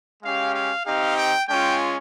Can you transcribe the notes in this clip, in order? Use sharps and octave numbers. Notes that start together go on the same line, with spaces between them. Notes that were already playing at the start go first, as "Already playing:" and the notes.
G#3 C#4 G4 F5
F5
C4 D#4 G4 F5
G5
G#3 C#4 F4 G5